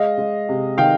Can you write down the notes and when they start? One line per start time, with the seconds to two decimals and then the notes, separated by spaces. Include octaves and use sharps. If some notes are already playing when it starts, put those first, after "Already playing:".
Already playing: G#3 D#5 F5
0.18 G#3
0.49 C3
0.78 D#3 F5 G5